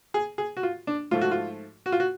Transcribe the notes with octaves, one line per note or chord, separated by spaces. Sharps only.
G#4
G#4
F#4
F4
D4
G#2 F3 A3 F4
F#4
F4
F#4
F4
F#4